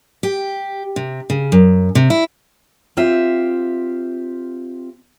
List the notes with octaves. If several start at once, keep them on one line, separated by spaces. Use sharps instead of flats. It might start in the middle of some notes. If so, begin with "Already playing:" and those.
G4
C3
C#3
F#2
C3
E4
C4 F4 G4 E5